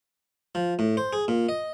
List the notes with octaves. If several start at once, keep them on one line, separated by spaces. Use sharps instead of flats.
F3
A2
C5
G#4
A#2
D#5